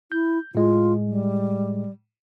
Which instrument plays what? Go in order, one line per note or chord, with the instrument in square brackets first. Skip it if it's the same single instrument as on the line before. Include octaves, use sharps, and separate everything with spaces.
[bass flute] E4 [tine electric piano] G6
[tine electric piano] A2 G#3 [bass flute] F4
[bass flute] G3